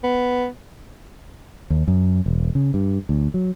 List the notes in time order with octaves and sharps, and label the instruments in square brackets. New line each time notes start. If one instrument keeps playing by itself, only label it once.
[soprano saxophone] B3
[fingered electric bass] D#2
F#2
E1
C#3
G2
D2
F#3